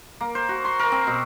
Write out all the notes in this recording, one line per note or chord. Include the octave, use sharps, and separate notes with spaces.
A#3
C5
F#4
C6
A#4
C4
B2